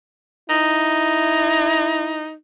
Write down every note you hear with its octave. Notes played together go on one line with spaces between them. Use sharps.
D#4 E4